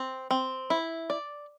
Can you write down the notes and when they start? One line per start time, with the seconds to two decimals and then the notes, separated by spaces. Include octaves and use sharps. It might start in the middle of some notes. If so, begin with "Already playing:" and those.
Already playing: C4
0.31 C4
0.70 E4
1.10 D5